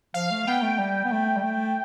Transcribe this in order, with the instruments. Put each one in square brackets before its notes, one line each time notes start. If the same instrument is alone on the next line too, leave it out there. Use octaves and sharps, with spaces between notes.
[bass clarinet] F3 [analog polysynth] F5
[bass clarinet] A3
[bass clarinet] B3 [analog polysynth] G5
[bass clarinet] A3
G3
B3
A3
G3
A3